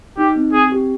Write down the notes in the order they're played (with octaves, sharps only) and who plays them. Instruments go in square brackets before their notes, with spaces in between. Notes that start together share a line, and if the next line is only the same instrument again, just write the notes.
[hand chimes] D#4 [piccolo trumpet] G4
[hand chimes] C4
[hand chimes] C4 [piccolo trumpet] G#4
[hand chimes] G4